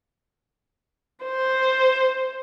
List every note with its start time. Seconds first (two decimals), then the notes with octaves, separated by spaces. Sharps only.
1.25 C5